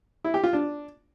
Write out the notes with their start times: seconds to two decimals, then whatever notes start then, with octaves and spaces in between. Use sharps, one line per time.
0.24 E4
0.34 G4
0.44 F4
0.53 D4